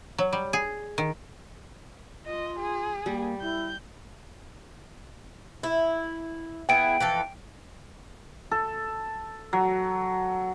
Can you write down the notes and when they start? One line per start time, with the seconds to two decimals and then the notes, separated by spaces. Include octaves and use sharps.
0.18 F#3
0.33 G3
0.53 G#4
0.98 D#3
2.26 F4 D#5
2.59 G#4
3.06 G3 A#3
3.41 E4 G6
5.63 E4
6.69 B3 E4 G#4 G5 D7
7.00 E3 F3 A4
8.51 A4
9.53 F#3